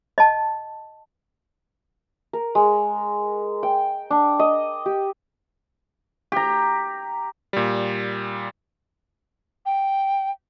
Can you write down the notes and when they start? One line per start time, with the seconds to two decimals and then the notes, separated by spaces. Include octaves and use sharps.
0.18 D#5 A5
2.33 A#4
2.55 G#3
3.63 G5
4.10 D4
4.39 D#5
4.86 G4
6.32 G4 A#5
7.53 A#2 G3
9.66 G5